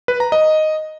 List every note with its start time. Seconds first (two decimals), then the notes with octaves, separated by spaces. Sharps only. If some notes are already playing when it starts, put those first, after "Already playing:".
0.08 B4
0.20 A#5
0.32 D#5